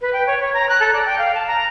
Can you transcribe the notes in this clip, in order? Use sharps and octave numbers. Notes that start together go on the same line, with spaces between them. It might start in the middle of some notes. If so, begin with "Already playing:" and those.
B4
G5
C#5
C#5
A#5
F#6
A4
D5
G5
F5
A5
A#5